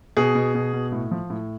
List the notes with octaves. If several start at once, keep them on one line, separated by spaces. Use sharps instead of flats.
B2 G#4
B2
B2
B2
A2
F3
A2